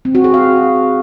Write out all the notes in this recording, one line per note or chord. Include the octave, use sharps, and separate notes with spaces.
C4
F#4
G#4
F5